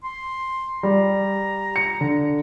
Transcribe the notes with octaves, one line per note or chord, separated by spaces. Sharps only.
C6
G3 A#5
C#7
D3